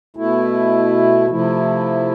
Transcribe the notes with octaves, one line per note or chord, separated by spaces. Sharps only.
B2 A3 E4
C3 F3 A3 E4